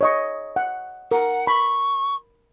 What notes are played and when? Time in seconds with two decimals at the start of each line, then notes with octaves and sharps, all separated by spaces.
0.01 C#5 D#5 C#6
0.56 F#5
1.11 A#4 F#5
1.47 B5 C#6